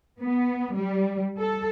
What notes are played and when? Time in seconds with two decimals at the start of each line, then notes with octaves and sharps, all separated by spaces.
0.21 B3
0.76 G3
1.40 A4